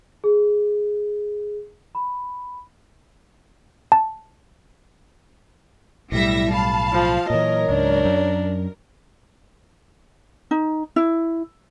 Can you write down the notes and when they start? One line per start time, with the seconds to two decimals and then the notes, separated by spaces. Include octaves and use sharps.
0.24 G#4
1.95 B5
3.92 A5
6.12 B1 A2 G3 E4 E5 A#6
6.53 F5 A5 B5
6.93 F3
7.30 A#2 E3 F#3 A#4 C#5 D#5
7.69 C#2 G#2 D4
8.05 F#2
10.51 D#4
10.96 E4